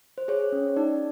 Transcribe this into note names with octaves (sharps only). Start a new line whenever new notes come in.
C5
G#4 C#5
C#4
D#4 D5